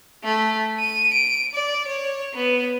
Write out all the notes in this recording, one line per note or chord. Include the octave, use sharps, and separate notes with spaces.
A3
D#7
D7
D5
C#5
B3